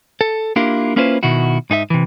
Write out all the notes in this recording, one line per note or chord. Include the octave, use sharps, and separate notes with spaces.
A4
A#3 D4 E4 F4 G4 A#4
A#3 C#4 E4 F4 B4 C5
B2 D#3 E4 F#4
G#2 D#4 G#4 E5
C3 E3